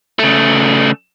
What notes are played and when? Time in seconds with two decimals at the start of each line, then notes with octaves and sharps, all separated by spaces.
0.19 C#3 A3